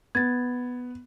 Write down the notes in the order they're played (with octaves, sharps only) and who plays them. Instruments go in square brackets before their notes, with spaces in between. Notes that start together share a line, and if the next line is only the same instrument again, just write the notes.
[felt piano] B3 [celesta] G#6 A6